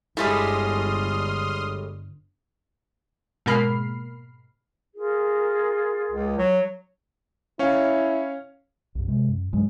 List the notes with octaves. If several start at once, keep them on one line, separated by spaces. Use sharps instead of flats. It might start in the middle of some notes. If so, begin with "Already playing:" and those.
G1 A2 G3 G#3 C6 D#6 F6
G#2 B2 A#3 B5 F6 C7
F4 G#4 A#4
C#2
F#3
C#4 E4 C#5 F5
C2 F#2
C3 G#3
F#2
G2 A#2 F#3 G#3